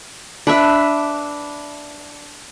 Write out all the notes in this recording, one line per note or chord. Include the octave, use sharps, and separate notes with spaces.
D4 B4 E5